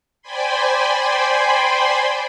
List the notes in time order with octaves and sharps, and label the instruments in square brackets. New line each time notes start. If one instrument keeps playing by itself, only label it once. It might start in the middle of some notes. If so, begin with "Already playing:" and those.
[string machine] C5 D5 G5 G#5 B5 C6